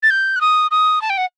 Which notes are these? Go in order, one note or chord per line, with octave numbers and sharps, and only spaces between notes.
A6
G6
F#6
D#6
D#6
A5
G5
F#5